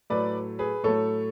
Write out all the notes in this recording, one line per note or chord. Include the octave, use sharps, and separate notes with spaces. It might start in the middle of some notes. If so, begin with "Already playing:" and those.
A2 F#3 A3 B4 D5
G#4 B4
A2 F#3 A3 A4 C#5